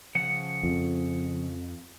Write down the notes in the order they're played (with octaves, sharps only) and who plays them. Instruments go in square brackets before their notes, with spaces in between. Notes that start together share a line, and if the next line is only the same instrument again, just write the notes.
[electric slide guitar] C#3 F3 F#5
[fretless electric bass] F2